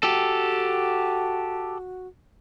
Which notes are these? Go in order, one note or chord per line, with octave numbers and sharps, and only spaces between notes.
F#4 G4 A4